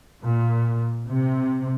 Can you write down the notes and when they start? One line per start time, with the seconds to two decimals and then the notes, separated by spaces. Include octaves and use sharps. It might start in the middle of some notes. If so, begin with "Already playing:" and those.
0.23 A#2
1.07 C3